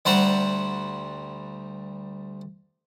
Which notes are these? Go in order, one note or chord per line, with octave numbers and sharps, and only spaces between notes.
D2 G3 C5 F#5 A#5